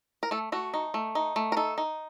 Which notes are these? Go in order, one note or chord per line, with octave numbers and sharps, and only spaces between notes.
A#4
A3 A4
A3 F#4
D#4
A3
D#4
A3
A#4
D#4 A4
D#4